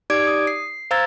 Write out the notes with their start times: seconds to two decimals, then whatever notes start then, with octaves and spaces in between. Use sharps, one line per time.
0.10 D#4 G4 D5 D6 G#6 D7
0.27 D#6
0.47 C7
0.91 C5 F5 A#5 E6 G#6 A6